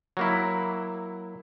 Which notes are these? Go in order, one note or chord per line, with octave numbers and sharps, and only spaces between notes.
F#3 A#3 E4